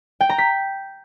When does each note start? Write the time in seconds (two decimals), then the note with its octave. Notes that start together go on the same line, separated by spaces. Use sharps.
0.21 G5
0.29 A#5
0.38 B6